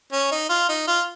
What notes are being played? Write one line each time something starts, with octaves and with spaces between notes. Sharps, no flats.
C#4
D#4
F4
D#4
F4